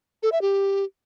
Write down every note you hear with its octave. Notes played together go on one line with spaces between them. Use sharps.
A4
E5
G4